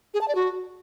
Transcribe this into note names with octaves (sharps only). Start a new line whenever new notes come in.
G#4
A5
D5
F#4